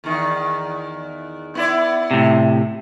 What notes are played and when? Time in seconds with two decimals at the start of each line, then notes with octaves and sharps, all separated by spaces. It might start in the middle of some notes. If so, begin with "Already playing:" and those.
0.04 E2 D#3
1.55 B3 E4 D5
2.11 A2 C3